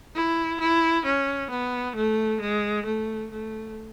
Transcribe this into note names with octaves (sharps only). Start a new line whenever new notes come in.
E4
E4
C#4
B3
A3
G#3
A3
A3